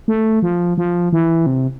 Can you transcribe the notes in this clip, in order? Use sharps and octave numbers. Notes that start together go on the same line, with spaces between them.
A3
F3
F3
E3
C3